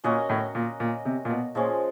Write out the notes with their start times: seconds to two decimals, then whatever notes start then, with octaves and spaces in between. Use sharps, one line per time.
0.04 A#2 C#4 F#4 A#4 D#5
0.29 A2
0.55 A#2
0.80 A#2
1.05 C3
1.25 A#2
1.30 B2
1.55 A#2 F3 G#3 C#4